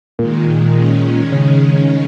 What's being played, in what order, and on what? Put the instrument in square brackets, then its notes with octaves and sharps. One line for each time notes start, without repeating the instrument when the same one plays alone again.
[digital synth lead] A#2 [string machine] D#3 G#3
[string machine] G#3 C#4
[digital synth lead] C#3